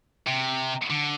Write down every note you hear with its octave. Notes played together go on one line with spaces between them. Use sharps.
C3
D3